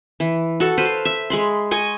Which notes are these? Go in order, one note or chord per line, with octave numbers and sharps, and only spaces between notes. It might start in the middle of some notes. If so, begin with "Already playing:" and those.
E3
F#4 A4
B4 C5 F5
E5
G#3 B5 C6
D#5 G#5 C#6